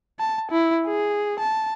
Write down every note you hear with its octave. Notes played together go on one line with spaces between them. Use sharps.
A5
E4
G#4
A5